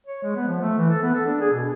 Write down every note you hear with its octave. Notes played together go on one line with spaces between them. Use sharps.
C#5
G#3
B3
F3
A3
E3
A4
B3
A4
D4
G#4
B2